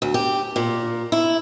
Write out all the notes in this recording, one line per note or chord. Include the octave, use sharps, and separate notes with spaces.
D2
G4
A#2
E4